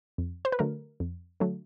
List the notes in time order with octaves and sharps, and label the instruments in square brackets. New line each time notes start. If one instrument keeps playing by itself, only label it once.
[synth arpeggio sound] F2
C5
B4
D3 F#3 A3 A#4
F2
D3 F#3 A3